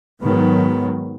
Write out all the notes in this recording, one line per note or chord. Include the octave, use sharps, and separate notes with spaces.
G#2 D#3 F#3 B3